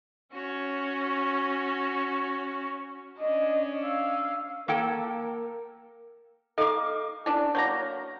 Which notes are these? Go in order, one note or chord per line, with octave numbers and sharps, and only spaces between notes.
C#4 F#4 C#5
C#4 D4 D#5
F5 E6
A#3 A4 A#4 G5
D#4 A4 F5 D6
C#4 D4 E4
F#3 A#3 C#5 A#5 C#6